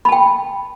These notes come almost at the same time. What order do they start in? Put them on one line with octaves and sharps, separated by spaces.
B5 A5 G5